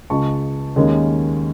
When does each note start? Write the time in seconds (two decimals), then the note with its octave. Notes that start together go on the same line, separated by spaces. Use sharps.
0.10 C#2 C#3 G#3 A5 C#6
0.76 D#2 D#3 G#3 C#4